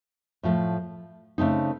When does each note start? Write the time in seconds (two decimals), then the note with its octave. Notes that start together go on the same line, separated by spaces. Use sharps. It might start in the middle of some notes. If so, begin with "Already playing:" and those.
0.43 A2 F3 A3
1.38 C#3 A3 C4 D#4